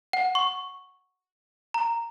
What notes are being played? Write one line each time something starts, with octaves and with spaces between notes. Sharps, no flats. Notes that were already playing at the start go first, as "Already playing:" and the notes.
F#5
C#6
A#5